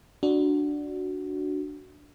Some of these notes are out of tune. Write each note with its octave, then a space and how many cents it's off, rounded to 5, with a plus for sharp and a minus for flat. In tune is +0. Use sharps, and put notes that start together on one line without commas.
D4 +0 F#4 +0